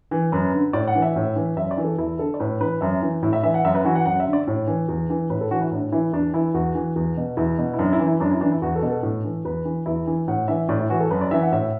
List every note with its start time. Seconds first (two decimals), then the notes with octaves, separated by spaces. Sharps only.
0.11 E3
0.32 F#2 B4
0.54 D3
0.73 A2 D5
0.88 F#5
0.95 E3
1.02 E5
1.16 A2
1.36 E3
1.57 F#2 E5
1.71 D5
1.77 E3
1.84 A4
1.98 E2 E4
2.19 D3 A4
2.34 D5
2.40 A2 B4
2.60 E3 B4
2.81 F#2 E5
3.02 E3
3.23 A2 E4
3.33 E5
3.43 E3 E5
3.54 F#5
3.65 F#2 E5
3.75 B4
3.85 E3 F#4
3.95 F#5
4.06 F#2 F#5
4.20 E5
4.27 D3
4.33 D5
4.47 A2
4.67 E3
4.88 E2
5.10 E3
5.30 A2 B4
5.41 A4
5.51 E3 F#4
5.61 E4
5.72 A2 D4
5.92 E3 E4
6.13 E2 D4
6.33 E3 E4
6.54 E2 F#4
6.75 E3
6.96 E2
7.17 B2
7.37 E2 E4
7.58 B2
7.73 E4
7.79 F#2 D4
7.93 E4
7.99 E3
8.07 E4
8.20 F#2 D4
8.31 E4
8.41 E3 D4
8.52 E4
8.62 E2 F#4
8.76 A4
8.82 B2
8.90 A4
9.03 A2
9.24 E3
9.45 E2 B4
9.65 E3
9.86 E2 E4
10.07 E3
10.28 A2 F#5
10.48 E3 E5
10.69 A2 D5
10.80 E4
10.90 E3 F#4
11.00 A4
11.11 F#2 B4
11.21 D5
11.31 E3 E5
11.42 F#5
11.52 A2 E5